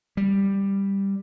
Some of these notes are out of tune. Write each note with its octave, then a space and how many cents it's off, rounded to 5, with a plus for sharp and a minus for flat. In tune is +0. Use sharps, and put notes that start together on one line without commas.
G3 +5